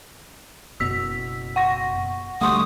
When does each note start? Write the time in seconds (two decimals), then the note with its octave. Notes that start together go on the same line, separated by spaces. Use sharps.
0.80 F#1 B2 E6 B6
1.56 F#5 C#6 A#6
2.41 D2 G3 A3 F#5 C6 C#6 D#6